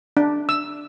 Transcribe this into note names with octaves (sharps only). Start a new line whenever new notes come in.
D4
E6